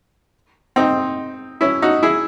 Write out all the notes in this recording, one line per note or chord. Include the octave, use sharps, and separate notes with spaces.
C4 D#4
C#4 E4
D#4 F#4
E4 G#4